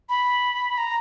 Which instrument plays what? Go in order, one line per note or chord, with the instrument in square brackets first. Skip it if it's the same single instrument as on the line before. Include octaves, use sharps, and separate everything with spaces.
[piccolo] B5
A#5